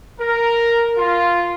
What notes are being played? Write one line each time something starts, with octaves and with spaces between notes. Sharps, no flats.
A#4
F4